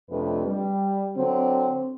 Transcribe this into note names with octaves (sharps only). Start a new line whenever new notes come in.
F2 C3 A3 D4 B4
G3
D3 F#3 C4